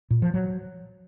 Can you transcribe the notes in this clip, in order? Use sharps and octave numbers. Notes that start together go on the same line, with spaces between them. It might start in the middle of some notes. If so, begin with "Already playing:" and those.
A#2
F3
F#3